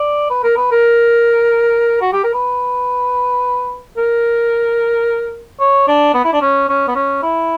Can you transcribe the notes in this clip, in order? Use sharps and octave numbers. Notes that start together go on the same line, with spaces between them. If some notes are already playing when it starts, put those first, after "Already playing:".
Already playing: D5
B4
A#4
B4
A#4
F#4
G4
A#4
B4
A#4
C#5
D4
B3
E4
D4
C#4
C#4
B3
C#4
E4